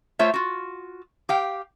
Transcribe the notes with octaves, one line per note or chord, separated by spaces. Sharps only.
A3 F4 C5 C#5 E5
F4 F#4
G4 F5 G5